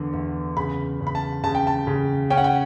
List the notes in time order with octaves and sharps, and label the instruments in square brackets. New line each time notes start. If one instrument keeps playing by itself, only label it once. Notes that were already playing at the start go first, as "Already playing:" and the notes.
Already playing: [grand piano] E2 D3
E2
C#3 B5
C#3
B5
A5
C#3 A5
G5
A5
C#3
C#4 G5
F#5
G5